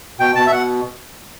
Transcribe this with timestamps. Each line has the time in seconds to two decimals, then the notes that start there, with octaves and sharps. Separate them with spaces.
0.19 B2 G5
0.35 B2 A5
0.47 E5
0.51 B2 F#5